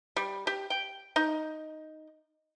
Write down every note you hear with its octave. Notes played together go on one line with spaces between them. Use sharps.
G3
G4
G5
D#4